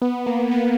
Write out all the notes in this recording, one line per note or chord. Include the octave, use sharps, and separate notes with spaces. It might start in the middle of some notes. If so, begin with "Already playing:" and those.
B3
A#3
B3